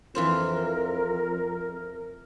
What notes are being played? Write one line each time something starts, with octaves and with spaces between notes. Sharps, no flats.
F2 E3 F4 A#4 C5